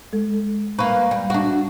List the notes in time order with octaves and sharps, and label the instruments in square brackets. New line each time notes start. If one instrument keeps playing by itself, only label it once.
[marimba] G#3 A4
[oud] A#3 B4 [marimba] C#6
[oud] G3
D4 F#4